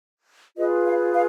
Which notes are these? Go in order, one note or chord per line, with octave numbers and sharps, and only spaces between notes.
F4 G#4 B4 D#5
F5
F5